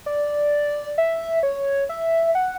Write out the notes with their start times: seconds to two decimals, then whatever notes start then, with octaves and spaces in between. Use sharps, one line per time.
0.06 D5
0.98 E5
1.43 C#5
1.89 E5
2.35 F#5